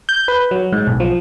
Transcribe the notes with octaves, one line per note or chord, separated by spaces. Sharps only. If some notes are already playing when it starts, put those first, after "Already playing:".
G6
B4
F#3
G#2
B1
F3